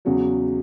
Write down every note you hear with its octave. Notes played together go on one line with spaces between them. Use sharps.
E2 C#3 F#3 F#4